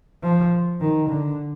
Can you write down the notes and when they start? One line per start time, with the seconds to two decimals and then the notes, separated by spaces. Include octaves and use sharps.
0.23 F3
0.81 D#3
1.10 D3